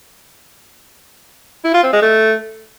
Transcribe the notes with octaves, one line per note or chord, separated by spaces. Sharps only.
E4
F4
C4
G#3
A3